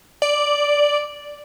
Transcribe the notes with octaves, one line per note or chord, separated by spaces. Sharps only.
D5